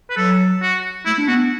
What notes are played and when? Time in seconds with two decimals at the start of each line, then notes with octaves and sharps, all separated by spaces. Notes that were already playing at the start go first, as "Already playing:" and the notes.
0.10 B4
0.16 F#3 A4
0.62 F#4
1.06 A3 E4
1.18 D4
1.28 B3 F#4